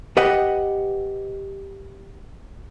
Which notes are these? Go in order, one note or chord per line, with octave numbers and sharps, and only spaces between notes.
G4 B4 D#5 F#5